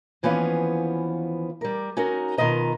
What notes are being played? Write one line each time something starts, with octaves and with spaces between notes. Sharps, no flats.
D#2 E3 F3 B3 C#4 F5
G3 A#4
C#4 D#4 F#4 A#4
B2 D#3 F4 B4 D#5 A#5